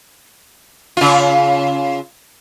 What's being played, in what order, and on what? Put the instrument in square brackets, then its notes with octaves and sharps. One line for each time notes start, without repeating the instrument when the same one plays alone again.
[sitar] C#3 F4